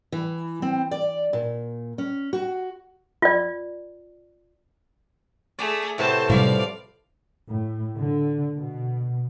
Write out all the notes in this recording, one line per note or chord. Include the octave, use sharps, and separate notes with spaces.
E3
C4
D5
A#2
C#4
F#4
F4 D5
A3 G#4 D5
A2 C3 B3 C5 A5
A2 C3 F3 G3 D5 F5
A2
D3
B2